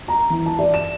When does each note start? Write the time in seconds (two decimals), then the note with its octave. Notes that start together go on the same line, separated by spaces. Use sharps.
0.08 A#5
0.30 E3
0.46 A5
0.59 D5
0.74 E7